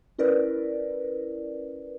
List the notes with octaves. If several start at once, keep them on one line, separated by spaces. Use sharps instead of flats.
C#4 E4 A#4 B4 D5